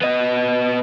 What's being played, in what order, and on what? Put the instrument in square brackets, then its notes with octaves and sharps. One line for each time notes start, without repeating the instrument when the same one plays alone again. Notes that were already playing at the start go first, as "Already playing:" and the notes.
[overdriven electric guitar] B3 D#5